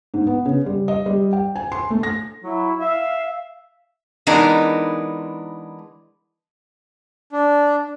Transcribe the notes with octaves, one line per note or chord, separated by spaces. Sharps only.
G#2
B3
C#3
G3
D#5
G3
G5
G#5
C6
A3
A#6
F#3 E4
E5 F5
E3 G#3 B3 D4 D#4 A#4
D4